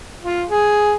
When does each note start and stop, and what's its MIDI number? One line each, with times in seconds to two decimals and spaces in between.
0.23 0.42 65
0.49 0.95 68